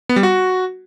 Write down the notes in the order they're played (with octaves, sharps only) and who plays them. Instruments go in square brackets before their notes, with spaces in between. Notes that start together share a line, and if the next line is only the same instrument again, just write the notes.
[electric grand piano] B3
G3
F#4